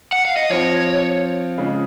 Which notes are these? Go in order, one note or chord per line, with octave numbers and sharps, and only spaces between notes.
F#5
F5
D#5
F3 C4 F4 C#5
C#3 G#3 C#4 F4